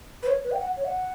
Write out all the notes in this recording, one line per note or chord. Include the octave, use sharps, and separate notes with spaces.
B4
C#5
B4
G5
F#5
C#5
F#5